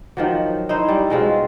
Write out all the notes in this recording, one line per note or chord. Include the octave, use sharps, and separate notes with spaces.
D#3 F3 F#3
D#4 E4 C5
G3 C#4
B2 G#3 C4 F4